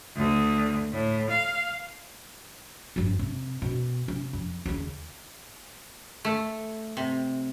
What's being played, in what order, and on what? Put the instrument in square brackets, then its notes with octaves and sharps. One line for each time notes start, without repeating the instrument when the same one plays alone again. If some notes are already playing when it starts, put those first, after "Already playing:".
[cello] D2
A2
F5
[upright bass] G1 F2
C3
B2
C3
F2
D#2 C#3
[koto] A3
C3